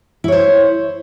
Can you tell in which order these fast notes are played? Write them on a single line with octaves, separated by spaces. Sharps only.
E4 C#5 C5